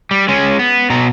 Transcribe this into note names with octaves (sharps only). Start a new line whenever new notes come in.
G3
G#3 C#4
B3
B2 A#5